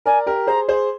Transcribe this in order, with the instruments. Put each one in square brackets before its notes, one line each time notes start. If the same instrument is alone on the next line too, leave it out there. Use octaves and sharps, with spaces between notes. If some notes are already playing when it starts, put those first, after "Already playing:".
[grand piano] A#4 D5 [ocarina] G#5
[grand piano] G4 A#4
[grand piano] G#4 C5 [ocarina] A#5
[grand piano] G#4 C5